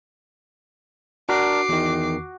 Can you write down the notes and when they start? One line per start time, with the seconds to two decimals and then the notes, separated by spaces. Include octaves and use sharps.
1.29 D4 F#4 A#4 D6 C7
1.69 E2 D#3